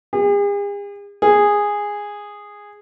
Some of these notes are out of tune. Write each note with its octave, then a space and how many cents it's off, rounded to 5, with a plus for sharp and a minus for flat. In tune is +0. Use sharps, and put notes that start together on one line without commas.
G#4 -45
G#4 -10